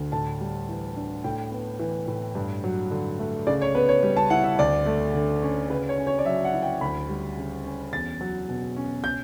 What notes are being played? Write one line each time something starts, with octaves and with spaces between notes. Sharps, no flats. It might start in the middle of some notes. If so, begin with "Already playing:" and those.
Already playing: D2 D3
A2 A5
G3
E3
D4
A2 G5
B3
E3
A2
G2
F#3
D3
A3
C#3 D5
C#5
B3 B4
C#5
G3
A5
E4 F#5
E5
D2 D5
A3
D3
C#4
C#3 B4
C#5
C#4
C#5
D5
F#3 E5
F#5
E4
G5
D2 B5
G3
C#3
C#4
E2 A6
F#3
B2
C#4
G6